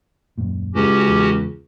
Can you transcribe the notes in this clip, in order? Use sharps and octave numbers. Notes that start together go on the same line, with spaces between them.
D#1 F#2 A#2
C#2 C#4 F#4 G4
E2